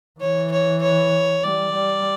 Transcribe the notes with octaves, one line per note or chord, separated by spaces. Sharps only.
E3 C#5
C#5
C#5
G3 D5
G3